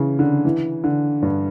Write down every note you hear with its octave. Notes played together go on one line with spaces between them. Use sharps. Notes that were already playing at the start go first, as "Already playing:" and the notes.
Already playing: C#3 E3
D3
E3
D3
G2